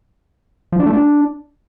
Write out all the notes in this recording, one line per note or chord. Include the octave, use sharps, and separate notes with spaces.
F3
D4
A3
D4